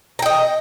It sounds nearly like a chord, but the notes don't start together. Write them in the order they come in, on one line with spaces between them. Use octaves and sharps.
A#5 G5 D#5